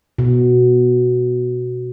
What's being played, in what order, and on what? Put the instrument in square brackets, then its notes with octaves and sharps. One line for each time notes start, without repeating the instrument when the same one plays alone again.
[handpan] B2